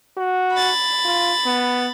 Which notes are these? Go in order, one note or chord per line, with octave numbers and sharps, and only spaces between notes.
F#4
B5 A6
F4
B3